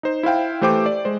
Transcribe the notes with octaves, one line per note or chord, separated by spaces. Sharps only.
D#4 C5
E4 C5 F5 G5
E3 A3 G4 C5 G5 D6
D5
G#3 C5